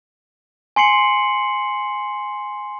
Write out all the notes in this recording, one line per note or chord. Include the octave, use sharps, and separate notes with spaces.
G#5 C6 C7 C#7 F#7